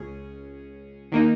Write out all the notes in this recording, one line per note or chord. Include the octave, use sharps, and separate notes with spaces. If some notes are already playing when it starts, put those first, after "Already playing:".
Already playing: C#2 C#4 G#4
D#3 A#3 D#4